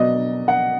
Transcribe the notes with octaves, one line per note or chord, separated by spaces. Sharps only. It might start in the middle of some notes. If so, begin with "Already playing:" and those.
Already playing: B2 F#3 B3 D5 D#5
F#5